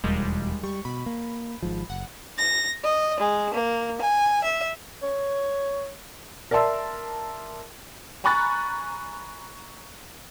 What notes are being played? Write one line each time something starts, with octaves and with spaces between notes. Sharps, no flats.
E1 D#2 G3 G#3
G3 C#6
B2 B5
A#3
G#1 G#2 F3
F#1 F#5
A#6
D#5
G#3
A#3
G#5
E5
C#5
A#4 D5 E5 A5 C6 E6
G#5 A#5 B5 C#6 F#6 A6